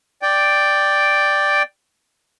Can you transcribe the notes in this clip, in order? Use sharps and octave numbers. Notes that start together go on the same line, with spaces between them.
D5 G5